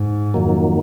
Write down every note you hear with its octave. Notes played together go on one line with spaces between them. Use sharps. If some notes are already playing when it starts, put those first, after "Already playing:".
Already playing: G#2
F2 D#3 F#3 A#3